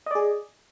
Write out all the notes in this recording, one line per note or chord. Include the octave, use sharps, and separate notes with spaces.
G#4 D5 D#5